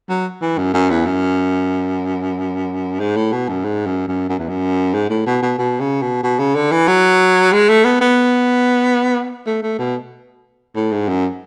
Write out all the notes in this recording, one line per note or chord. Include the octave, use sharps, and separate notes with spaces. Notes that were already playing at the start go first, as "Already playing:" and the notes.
F#3
E3
F#2
F#2
E2
F#2
G#2
A2
B2
F#2
G#2
F#2
F#2
F#2
E2
F#2
G#2
A2
B2
B2
B2
C#3
B2
B2
C#3
D3
E3
F#3
G#3
A3
B3
B3
A3
A3
B2
A2
G#2
F#2